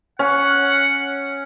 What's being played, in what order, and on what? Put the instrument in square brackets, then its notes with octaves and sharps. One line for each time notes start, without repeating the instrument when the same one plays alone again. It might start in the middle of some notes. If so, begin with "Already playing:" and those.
[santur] C#4 [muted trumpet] F#5